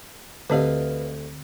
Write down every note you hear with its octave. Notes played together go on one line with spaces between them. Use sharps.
D2 D3 C4 G4 B4 D#5 F5